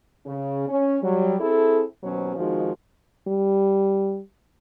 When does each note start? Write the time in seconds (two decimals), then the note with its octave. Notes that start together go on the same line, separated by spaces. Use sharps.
0.26 C#3
0.68 C#4
1.02 F#3 G3
1.40 C4 E4 G#4 A4
2.03 D#2 B2 F#3 C#4 C5
2.36 F2 D#3 F3 G#3 D#4 F#4
3.28 G3